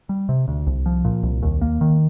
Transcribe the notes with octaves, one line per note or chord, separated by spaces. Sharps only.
G3
C3
D2
C2
F3
A#2
C2
D#2
A#3
D#3